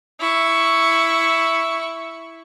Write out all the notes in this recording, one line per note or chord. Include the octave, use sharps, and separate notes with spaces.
E4 C#6